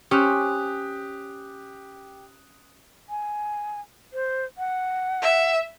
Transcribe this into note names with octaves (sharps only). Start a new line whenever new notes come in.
C#4 G4 C5 D#6 F#6
G#5
C5
F#5
E5